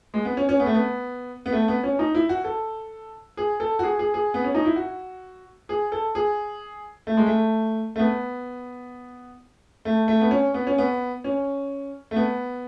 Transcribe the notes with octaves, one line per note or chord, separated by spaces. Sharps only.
G#3
B3
C#4
C#4
B3
A3
B3
B3
A3
B3
C#4
D#4
E4
F#4
A4
G#4
A4
F#4
G#4
G#4
G#4
B3
C#4
D#4
E4
F#4
G#4
A4
G#4
A3
G#3
A3
A3
B3
A3
A3
B3
C#4
B3
C#4
B3
C#4
A3
B3